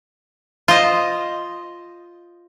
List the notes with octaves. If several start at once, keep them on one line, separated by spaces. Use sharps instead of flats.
F4 C5 D#5